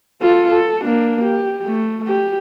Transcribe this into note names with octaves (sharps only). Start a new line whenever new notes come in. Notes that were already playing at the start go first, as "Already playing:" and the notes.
F4 A4
A4
A#3 D4
G4
A3
G4